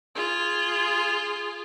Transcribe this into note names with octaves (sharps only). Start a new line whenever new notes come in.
F4 G#4